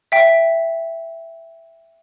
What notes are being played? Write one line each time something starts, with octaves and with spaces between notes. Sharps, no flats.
E5 G5